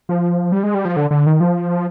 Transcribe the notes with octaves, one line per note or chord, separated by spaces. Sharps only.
F3
G3
G#3
G3
F3
D3
D3
D#3
F3